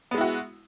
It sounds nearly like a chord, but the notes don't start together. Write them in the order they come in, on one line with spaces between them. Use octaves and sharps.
B3 G#3 E4 F#4